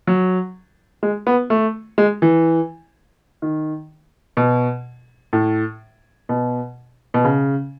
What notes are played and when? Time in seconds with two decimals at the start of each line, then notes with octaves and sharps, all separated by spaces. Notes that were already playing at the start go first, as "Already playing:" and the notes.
0.07 F#3
1.03 G#3
1.27 B3
1.50 A3
1.98 G#3
2.22 E3
3.42 D#3
4.37 B2
5.33 A2
6.29 B2
7.14 B2
7.24 C#3